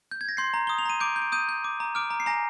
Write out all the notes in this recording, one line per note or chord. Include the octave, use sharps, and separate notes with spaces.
G6
G#6
A#6
C6 G6 C7
A#5
D#6 G7
F7
A#5 D#7
D6 G6 D7
G6
D7
D#6 G6 D#7
G6
D6
A#5
D6 F6 D7
A#5
C7
G#5 A#5 A#6